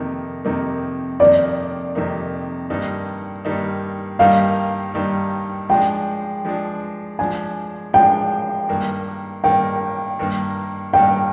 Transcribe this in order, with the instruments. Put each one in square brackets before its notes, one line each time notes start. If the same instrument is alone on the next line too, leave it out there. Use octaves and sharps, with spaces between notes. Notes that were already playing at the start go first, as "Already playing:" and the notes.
Already playing: [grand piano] F2 C3 D#3 A#3 D#4
F2 C3 D#3 A#3 D#4
[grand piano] F2 C3 D#3 A#3 D#4 [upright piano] D5
[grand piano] F2 C3 D#3 A#3 D#4
G2 D#3 G3 A#3 D#4
G2 D#3 G3 A#3 D#4
[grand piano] G2 D#3 G3 A#3 D#4 [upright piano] F5
[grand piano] G2 D#3 G3 A#3 D#4
[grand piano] F3 G#3 D4 [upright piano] G5
[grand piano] F3 G#3 D4
[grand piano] F3 G#3 D4 [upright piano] G#5
[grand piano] F3 G#3 D4 [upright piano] G5
[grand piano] G2 D#3 A#3
[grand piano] G2 D#3 A#3 [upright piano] G5
[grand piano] G2 D#3 A#3
[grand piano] G2 D#3 A#3 [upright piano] G5